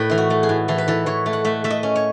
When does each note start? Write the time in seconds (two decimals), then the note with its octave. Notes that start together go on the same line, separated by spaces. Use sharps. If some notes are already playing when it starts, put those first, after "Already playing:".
Already playing: A2 B4
0.10 E3 E4
0.18 F#4
0.30 A3
0.43 G#4
0.49 A2
0.68 E3 A4
0.78 B4
0.88 E3 A4
1.06 E3 C#5
1.26 A3
1.33 F#5
1.45 A3 E5
1.64 A3 E5
1.70 D#5
1.83 C#4
1.96 C#5